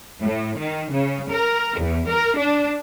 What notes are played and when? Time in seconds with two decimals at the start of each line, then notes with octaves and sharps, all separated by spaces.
0.22 A2
0.57 D#3
0.91 C#3
1.31 A#4
1.80 E2
2.09 A#4
2.38 D4